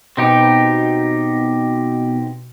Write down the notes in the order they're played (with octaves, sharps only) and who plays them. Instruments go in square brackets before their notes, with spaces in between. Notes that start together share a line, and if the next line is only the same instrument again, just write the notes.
[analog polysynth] B2 [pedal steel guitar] C4 D#4 G4